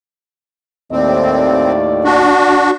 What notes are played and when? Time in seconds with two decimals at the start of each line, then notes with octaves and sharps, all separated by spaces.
0.92 D#2 A2 C4 D5
2.04 D4 F#4